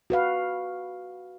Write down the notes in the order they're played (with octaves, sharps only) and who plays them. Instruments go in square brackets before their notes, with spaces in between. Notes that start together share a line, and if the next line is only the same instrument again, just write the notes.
[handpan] F#4 B4 F5